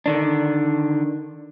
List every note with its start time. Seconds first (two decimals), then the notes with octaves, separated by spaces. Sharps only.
0.06 D3 D#3 D4